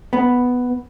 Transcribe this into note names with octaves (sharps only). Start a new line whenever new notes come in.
B3